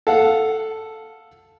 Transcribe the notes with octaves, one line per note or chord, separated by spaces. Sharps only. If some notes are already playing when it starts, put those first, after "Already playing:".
A4 F5 F#5